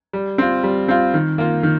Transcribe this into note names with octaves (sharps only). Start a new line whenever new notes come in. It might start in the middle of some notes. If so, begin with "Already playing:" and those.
G3
C4 F4
G3
C4 F4
D#3
A#3 F4
D#3